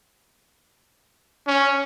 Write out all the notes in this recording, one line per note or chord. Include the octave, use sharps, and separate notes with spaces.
C#4